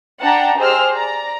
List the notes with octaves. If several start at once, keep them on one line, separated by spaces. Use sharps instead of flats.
D4 F#5 G5 A5 A#5
G4 G#4 C5 D#5 E6 F6
D5 A#5